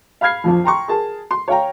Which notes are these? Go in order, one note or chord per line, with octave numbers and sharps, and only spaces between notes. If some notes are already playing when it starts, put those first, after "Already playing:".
F5 B5 F6 G#6 C7
A#1 F2 F3
G5 A#5 C6 C#6
G#4 A#4 A5
C6
C#5 F5 G5 A#5